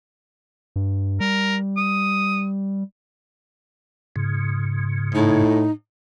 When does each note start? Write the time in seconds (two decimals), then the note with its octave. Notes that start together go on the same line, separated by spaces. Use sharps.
0.76 G2
1.21 G3 A#4
1.77 D#6
4.16 G#2 C#3
5.15 A2 D#4